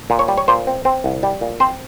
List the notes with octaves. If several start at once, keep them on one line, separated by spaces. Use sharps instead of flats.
A#2
C#5
G3
C#5
A#2 C5
C4
C4
C2
G3
A#2
C4 C5